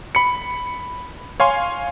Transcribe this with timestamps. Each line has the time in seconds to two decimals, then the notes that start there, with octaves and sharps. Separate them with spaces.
0.15 B5 C#7
1.40 C#5 F5 G#5 C6